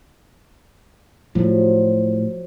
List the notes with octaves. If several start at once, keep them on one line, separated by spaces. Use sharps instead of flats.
A2 F3 F#3